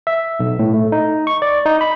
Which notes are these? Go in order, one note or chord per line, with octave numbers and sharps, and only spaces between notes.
E5
B1
A2
A3
D#4
C#6
D5
D#4
B5